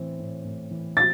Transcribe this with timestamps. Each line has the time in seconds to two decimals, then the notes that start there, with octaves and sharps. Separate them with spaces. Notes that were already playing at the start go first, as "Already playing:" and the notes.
Already playing: A2 E3 C4
0.19 A2
0.44 A2
0.71 E3
0.97 C4 A6